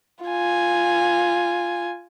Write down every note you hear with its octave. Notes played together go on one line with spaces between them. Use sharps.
F4 G#5